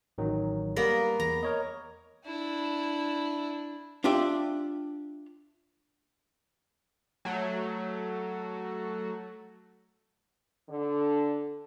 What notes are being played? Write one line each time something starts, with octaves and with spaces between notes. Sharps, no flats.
A1 D#3 F#3
G3 A#3 B3 A#4
E2 A#5
A#4 C#5 D#5
D4 E4
D4 F4 G4 D5 E5
F#3 A3
D3